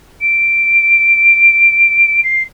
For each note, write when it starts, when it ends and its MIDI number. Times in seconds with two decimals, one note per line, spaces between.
0.21 2.20 98
2.23 2.43 96